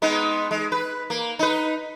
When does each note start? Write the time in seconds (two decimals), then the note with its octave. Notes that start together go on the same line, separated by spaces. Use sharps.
0.02 G#3 B3 D#4
0.51 G#3
0.72 B4
1.10 A#3
1.39 D#4 B4